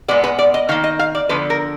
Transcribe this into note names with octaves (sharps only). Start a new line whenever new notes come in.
A#2 G#3 B3 D5
B4
D5
D#5
D#3 A#3 F5
D#5
F5
D5
D3 F3 B3 B4
A#4